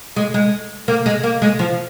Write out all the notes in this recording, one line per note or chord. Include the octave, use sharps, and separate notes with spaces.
G#3
G#3
A#3
G#3
A#3
G#3
F3